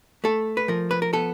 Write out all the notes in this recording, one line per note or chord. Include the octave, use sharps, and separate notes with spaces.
A3 A4
B4
F3 A#4
B4
A#4
B3 A4